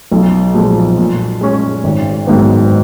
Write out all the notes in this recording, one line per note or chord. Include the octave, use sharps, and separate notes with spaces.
B1
A#2 F3 G#3
A#2
G#3 C#4 G#4
G#1
G#2 D#3 F#3 B3